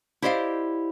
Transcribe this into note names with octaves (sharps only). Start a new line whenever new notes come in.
E4 G4 C5 D5 D#5 F5